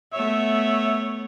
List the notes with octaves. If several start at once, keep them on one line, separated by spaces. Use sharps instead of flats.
A3 B3 C#5 E5